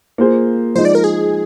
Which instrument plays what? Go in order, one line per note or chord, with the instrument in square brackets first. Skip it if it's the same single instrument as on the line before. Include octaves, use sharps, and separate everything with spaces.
[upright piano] A#3 F4 G#4 C5
[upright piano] F3 G#3 D#4 [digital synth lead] C5
[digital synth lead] D5
A#4
G#4